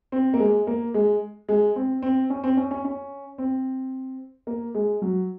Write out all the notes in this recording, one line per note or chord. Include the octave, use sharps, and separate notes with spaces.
C4
A#3
G#3
A#3
G#3
G#3
C4
C4
C#4
C4
C#4
C#4
C#4
C4
A#3
G#3
F#3